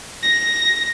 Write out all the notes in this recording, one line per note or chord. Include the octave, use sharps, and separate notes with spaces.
A#6